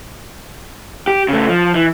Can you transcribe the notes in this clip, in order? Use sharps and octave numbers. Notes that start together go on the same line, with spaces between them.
G4
C#3 A3
F3
E3